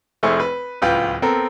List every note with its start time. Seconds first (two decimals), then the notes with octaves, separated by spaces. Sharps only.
0.23 F1 A3 E4 G#4 C5 C#6
0.40 B4
0.82 D1 C#2 F4 B4 G5 G6
1.22 B3 C4 A4 A#4